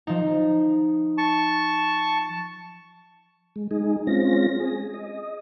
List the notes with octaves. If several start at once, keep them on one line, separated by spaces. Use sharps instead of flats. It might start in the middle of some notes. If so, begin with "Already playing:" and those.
F3 D#4
A5 C#6
G#3
G#3 D#4 G#4
G#3 C4 C#4 F4 A#6
G#4
D#5